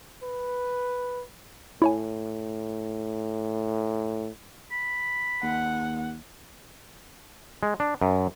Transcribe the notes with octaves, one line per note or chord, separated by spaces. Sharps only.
B4
A2 E4 C#5 G#5
B5
D#2 F#5
G#3
D4
F#2